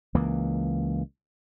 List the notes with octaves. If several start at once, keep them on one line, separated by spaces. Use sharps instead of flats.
C#2 E3 A#3